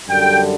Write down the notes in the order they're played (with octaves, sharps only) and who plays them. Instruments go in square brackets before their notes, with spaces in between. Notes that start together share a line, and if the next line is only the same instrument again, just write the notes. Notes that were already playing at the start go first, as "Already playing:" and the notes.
[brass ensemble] F#2 D3 G3 G5